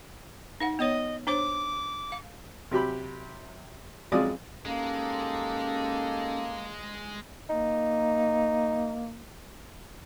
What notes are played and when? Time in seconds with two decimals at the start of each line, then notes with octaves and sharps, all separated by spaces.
0.60 D#4 F5 F#5
0.79 B3 C#5 D#5
1.27 D4 C5 C#5 D6
2.12 F5
2.71 C3 F#3 G4 B5
4.12 F2 F#3 G#3 F4 D5 D#6
4.65 G#3 A#3 C#4 D#4 G4 A4
7.50 A#3 D#4